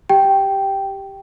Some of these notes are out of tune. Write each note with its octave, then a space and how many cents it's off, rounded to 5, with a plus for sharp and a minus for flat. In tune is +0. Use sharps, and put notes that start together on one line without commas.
G4 +0 G5 -5